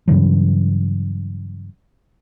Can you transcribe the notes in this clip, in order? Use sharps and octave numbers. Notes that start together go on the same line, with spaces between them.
G2 C#3 E3 F#3